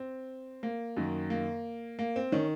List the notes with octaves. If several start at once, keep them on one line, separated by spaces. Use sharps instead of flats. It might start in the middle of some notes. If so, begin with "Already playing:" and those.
Already playing: C4
A#3
F#2 D#3
A#3
A#3
C4
D#3 C#4